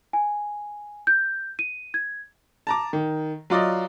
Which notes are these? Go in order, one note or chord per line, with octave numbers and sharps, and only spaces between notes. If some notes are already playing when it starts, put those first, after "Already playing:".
G#5
G6
D#7
G#6
A5 A#5 D6
D#3
F#3 F4 D5 D#5